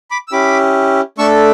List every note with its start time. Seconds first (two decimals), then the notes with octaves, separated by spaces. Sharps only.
0.11 B5 D6
0.28 E6
0.32 C#4 E4 G4 B5 D6
1.18 A3 D4 A4 C#6 E6